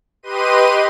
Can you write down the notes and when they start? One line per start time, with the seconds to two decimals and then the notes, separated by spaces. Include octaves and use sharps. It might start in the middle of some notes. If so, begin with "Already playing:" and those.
0.23 G4 B4 D#5 C6 D#7